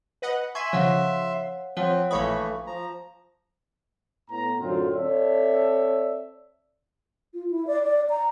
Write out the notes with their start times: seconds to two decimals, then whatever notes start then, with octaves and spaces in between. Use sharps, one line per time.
0.22 B4 D#5 F#5
0.55 E5 G#5 C6 C#6 B6
0.73 C#3 F3 C#5 F5 F#5
1.77 F3 C4 C#5 F#5
2.11 A#1 E3 A3 C#5 F5 B5 C#6 D#6
2.67 F3 A#5
4.30 A2 B3 A#5
4.60 F#2 A2 D3 F#3 C4 F4
4.94 C4 A4 C#5 D5 E5
7.34 F4
7.51 E4
7.67 D5
7.83 D5
8.10 A#5